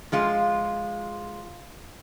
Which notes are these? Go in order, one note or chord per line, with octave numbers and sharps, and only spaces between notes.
F3 G#3 F4